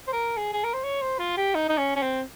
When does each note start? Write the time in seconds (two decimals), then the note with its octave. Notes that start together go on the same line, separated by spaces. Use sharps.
0.07 C5
0.13 A#4
0.37 G#4
0.53 G#4
0.64 A#4
0.74 C5
0.84 C#5
1.02 C5
1.19 F4
1.37 G4
1.55 D#4
1.69 D#4
1.78 C#4
1.96 C#4
2.02 C4